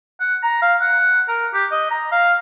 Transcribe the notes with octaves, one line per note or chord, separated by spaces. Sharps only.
F#5
A#5
F5
F#5
A#4
G4
D#5
A#5
F5